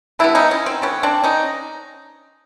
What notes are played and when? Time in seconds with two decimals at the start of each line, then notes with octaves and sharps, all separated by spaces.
0.19 D3 G3 B3 D4 E4
0.35 C#4 D#4
0.51 C#4
0.66 C4
0.82 D3 G3 B3 C#4
1.03 C4 D4
1.23 C#4 D#4